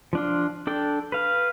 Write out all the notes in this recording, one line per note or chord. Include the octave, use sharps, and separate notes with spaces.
F3 D4 F4
D4 A4 G5
B4 F5